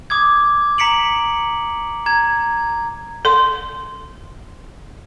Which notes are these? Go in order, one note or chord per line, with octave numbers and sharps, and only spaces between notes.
D6 D#6 G#6
A#5 B6 C#7 D7 F#7
A#5 G#6
A4 C6